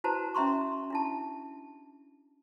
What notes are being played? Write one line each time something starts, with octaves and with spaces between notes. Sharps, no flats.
E4 F#4 B4 C5 A5 A#5
C#4 E5 A#5 C6 C#6
D4 E4 A5